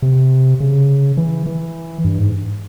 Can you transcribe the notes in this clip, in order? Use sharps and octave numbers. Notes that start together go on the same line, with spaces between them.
C3
C#3
E3
E3
G2
G#2